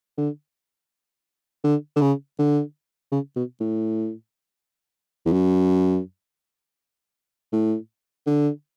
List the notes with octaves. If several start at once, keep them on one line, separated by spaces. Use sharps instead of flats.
D3
D3
D3
C#3
D3
C#3
B2
A2
E2
F#2
A2
D3